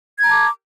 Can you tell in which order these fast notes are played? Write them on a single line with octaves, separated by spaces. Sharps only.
G#6 A#5 A5 D6